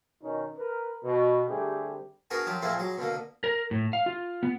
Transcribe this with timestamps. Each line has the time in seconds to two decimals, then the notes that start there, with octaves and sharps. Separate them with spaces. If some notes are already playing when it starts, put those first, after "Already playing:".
0.22 B2 D#3 C#4 D#4
0.58 A#4 B4
1.04 B2
1.48 D3 G3 A3 C4 G4 G#4
2.31 B3 D4 F#4 G#4 A#4
2.46 F3 F#3 G4
2.62 F2 A#2 G#3 A3 C4 E4
2.79 F#3 G#3
2.98 B2 D3 A#3
3.44 A#4
3.71 A2
3.93 F5
4.06 F4
4.43 B3